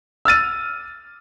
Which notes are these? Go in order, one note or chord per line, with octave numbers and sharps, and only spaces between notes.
E6 F6 A6 D#7